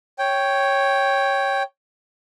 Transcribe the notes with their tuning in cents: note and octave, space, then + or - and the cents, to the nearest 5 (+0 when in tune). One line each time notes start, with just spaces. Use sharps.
C#5 +0 G5 +0